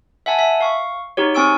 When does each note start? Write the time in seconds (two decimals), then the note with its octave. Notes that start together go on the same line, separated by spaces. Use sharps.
0.26 E5 F#5 G#5 A5
0.39 E5
0.61 F5 C#6
1.17 D#4 F#4 G4 C#5
1.35 C4 G#5 C#6 E6 D7